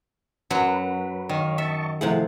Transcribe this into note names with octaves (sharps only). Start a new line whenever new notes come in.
F#2 F#3 F#4 B4
D#3 C#5 F5
D#5 E5 A5 C#6
C3 F3 A3 E4 G#4 F#5